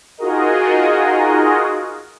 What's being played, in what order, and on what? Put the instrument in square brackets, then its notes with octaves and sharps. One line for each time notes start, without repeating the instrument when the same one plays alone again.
[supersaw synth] D#4 F4 F#4 G#4 A#4 D#5